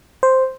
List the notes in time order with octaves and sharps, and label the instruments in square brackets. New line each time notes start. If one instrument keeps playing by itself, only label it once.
[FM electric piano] C5